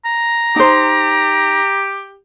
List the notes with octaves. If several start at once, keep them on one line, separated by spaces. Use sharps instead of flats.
A#5
D#4 G4 C5